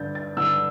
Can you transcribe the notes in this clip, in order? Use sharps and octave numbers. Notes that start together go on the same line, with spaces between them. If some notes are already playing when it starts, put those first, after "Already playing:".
Already playing: G2 D3 G6 A6
A6
G2 D3 E6